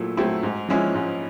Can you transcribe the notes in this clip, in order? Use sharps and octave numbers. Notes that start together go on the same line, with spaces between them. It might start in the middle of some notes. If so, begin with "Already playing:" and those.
Already playing: A#2 F#3 A3 E4
F#3 A3 C4 E4
G#2
F3 G#3 C#4 E4
G#2